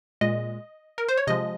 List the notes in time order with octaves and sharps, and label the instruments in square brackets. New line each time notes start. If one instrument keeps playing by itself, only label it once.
[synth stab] A#2 G#3 D#5
A#4
C5
C#5
C3 F3 G#3 D#5